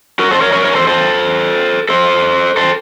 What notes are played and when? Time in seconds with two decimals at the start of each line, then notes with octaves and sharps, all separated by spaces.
0.19 F#4 A#4
0.31 A4 C5
0.41 A#4 C#5
0.53 A#4 C#5
0.64 A#4 C#5
0.75 A4 C5
0.87 A4 C5
1.89 A4 C5
2.57 A4 C5